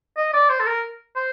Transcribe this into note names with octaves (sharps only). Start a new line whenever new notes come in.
D#5
D5
C5
A4
A#4
C5